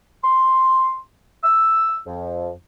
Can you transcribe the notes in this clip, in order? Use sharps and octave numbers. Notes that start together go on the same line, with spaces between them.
C6
E6
F2